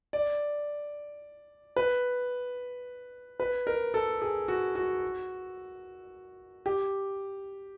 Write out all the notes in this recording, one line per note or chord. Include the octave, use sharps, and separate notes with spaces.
D5
B4
B4
A#4
A4
G#4
F#4
F#4
G4